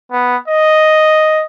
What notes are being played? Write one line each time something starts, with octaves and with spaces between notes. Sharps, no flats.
B3
D#5